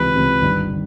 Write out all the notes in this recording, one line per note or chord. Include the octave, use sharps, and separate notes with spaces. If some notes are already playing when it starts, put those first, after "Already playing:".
Already playing: C#2 C3 E3 B4
C#2 C3 E3
G1 G2 D#3
D#3